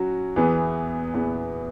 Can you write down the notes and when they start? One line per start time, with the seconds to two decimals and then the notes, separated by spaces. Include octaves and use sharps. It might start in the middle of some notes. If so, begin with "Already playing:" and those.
Already playing: F#3 C#4 F#4
0.36 E2 E3 B3 G#4
1.14 E2 E3 B3 G#4